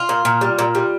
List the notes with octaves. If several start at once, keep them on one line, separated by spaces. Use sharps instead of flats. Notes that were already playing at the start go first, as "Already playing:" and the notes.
Already playing: F4
A#2
A#2
G3
A#2
G3